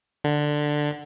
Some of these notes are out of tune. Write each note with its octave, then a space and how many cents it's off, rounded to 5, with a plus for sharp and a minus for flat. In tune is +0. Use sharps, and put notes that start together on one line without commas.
D3 +10